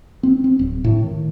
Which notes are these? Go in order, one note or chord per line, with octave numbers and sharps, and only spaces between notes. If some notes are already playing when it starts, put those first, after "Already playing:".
C4
C4
D1
A2
D#3